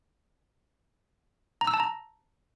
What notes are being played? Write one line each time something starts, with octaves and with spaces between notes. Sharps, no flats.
A#5
E6
A5
A#5